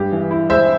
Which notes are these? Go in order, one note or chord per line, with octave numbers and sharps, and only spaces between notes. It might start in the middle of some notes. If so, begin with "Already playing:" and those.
Already playing: G2 G#3 G4
E3
E4
G#3 C5 E5